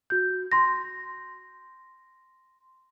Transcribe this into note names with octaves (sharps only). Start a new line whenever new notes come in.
F#4 G6
C6 A#6